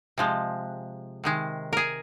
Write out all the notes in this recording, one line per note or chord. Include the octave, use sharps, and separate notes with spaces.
C3 F3 G#3
C3 D#3 G#3
G#4 A#4